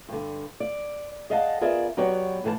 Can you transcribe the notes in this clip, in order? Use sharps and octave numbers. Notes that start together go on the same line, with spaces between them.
G2 D3
D5
G#4 D5 D#5 F5 F#5 A5
B3 F4 G#4 A#4 D5 E5
F#3 B3 F#4 G4 C#5 D5
D#2 A2 E3 A4 A5